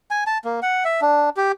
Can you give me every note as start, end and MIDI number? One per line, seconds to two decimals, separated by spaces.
0.11 0.24 80
0.27 0.38 81
0.45 0.60 58
0.62 0.84 78
0.85 1.01 76
1.01 1.30 62
1.37 1.52 67